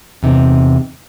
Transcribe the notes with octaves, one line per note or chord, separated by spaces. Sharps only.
E2 C3 D#4